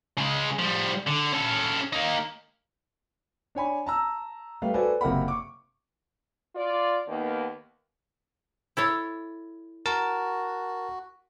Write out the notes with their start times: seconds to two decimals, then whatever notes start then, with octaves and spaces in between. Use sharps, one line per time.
0.18 C#3 G#3
0.59 F3 G3
1.07 D3
1.33 C#4 A4
1.93 A#3 D#4
3.55 D4 C#5 G#5 B5
3.86 A5 A#5 E6
4.62 G3 A3 B4 F5
4.74 F#4 A4 B4 C5 D5 G#5
5.01 F#1 C3 A#4 E5 F#5 B5
5.28 C#6 D6
6.54 F4 D5
7.08 D#2 D#3 A#3 B3
8.77 E4 A4 C#5
9.86 F#4 A#4 A5